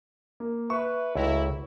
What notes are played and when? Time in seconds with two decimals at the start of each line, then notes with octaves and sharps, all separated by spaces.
0.40 A#3
0.70 B4 E5 C#6
1.15 C#2 F#3 A3 E4 A#5